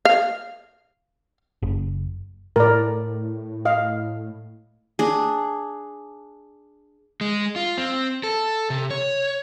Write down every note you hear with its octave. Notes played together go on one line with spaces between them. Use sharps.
F5
F#1
A2 A#4 D5
D#5 F5
D4 G#4
G#3
F4
C4
A4
C3
C#5